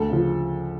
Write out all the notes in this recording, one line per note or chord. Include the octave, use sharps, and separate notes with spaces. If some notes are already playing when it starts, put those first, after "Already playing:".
Already playing: D2 A4
C#3 F3